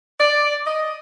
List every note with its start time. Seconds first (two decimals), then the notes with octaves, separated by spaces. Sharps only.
0.19 D5
0.65 D#5